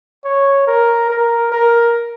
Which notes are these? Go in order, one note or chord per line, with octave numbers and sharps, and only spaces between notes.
C#5
A#4
A#4
A#4